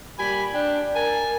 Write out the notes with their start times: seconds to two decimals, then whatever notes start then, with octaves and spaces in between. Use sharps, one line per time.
0.18 A#2 G3 G4 G#5 B5
0.53 D4 G5
0.95 A#4 G#5 A5